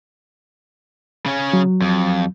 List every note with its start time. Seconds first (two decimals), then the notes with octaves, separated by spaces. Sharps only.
1.26 C#3 C#4
1.53 F#3
1.81 F2